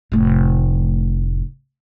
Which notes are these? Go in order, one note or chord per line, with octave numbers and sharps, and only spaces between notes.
F1 A2